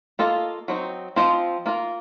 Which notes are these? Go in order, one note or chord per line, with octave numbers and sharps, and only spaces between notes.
A#3 F4 A4 D#5
F#3 C4 D#4
F3 C4 F4 C5 D#5
A#3 F4 A#4